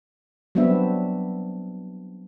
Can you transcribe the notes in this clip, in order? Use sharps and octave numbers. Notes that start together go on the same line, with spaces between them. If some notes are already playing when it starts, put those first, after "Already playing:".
F#3 G3 B3 C4 D4 E5